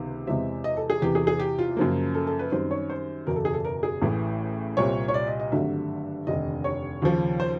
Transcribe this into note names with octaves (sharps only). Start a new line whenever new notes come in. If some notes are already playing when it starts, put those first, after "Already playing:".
Already playing: C#2 C3 D#3 B3
E2 C3 E3 G#3 C4 E5
D#5
A4
G#4
E2 C3 E3 G4
G#4
G#4
G4
F4
F#2 C#3 F3 A#3
A4
A4
B4
F#2 D#3 G3 C4 C5
C#5
C5
F#1 E2 B2 A#4
A4
G#4
A4
A#4
G#4
A1 A2 E3
C2 A#2 G3 C4 C#5
C#5
D5
D#5
D#5
G#1 G2 D3 F#3 A3 E5
F1 D#2 D3 D#5
C#5
D#2 C#3 F3
C5